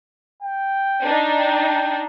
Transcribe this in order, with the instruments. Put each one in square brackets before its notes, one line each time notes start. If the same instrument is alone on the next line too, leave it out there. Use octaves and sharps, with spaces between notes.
[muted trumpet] G5
[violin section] D4 D#4
[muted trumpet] G5